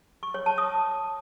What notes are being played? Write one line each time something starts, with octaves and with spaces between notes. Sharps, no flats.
C#6
C#5
A5
D#6